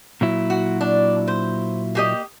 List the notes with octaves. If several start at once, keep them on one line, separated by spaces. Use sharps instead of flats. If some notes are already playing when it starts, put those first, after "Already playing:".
A#2 F#3 E4
F#4
D4
C5
A#3 G4 D#5